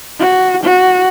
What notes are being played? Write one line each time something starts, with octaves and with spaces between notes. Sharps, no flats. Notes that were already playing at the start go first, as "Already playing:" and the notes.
F#4
F#4